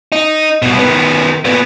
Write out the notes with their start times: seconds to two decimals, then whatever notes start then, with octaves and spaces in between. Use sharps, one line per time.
0.12 D#4
0.62 C2 B2
0.79 D#3 B3
1.45 A#2 B3